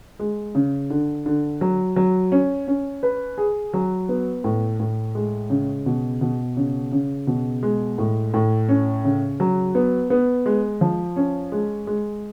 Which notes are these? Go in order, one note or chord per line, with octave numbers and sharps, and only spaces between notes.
G#3
C#3
D3
D3
F#3
F#3
C#4
C#4
B4
G#4
F#3
B3
A2
A2
G#3
C#3
B2
B2
C#3
C#3
B2
G#3
A2
A2
C#4
C#3
F#3
B3
B3
G#3
F3
C#4
G#3
G#3